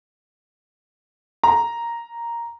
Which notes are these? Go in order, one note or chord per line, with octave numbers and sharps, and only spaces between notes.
A#5